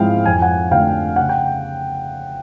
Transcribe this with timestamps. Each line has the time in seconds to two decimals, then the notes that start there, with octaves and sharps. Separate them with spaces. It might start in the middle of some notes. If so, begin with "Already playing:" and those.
Already playing: G#2 F3 G#3 C4 E4 F5 G5
0.26 F2 G#5
0.42 F#5 G#5
0.71 D3 F3 A3 D4 F5 G5
1.16 C#3 F#5
1.29 G5